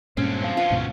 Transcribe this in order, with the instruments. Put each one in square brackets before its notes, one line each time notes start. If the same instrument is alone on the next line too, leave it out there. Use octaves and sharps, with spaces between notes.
[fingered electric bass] G2 A#2 G#3 [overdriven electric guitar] D3 C4 [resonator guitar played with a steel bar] C#4
[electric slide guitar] C5 F5
[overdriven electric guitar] B3 C#4 [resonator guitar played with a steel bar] F4
[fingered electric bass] D2 G#2 B2